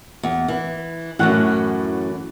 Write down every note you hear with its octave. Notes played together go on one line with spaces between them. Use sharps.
E2
E3
F#2 A2 E3 C#4 F#5 F#6